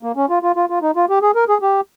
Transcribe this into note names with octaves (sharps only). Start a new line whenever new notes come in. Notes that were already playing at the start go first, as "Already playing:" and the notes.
A#3
C#4
F4
F4
F4
F4
D#4
F4
G4
G#4
A#4
G#4
G4